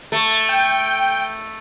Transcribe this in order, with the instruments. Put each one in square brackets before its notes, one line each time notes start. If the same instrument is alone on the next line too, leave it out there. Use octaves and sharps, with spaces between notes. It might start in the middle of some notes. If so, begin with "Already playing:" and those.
[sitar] A3
[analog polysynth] G5